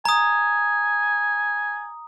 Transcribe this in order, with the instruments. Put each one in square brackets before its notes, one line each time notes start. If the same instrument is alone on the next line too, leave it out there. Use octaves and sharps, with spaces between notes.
[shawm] G#5 [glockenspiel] A#5 D#6